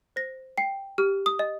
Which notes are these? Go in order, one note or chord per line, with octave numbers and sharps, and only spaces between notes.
C5 A#6
G5 C7
G4 F6
D#6
D#5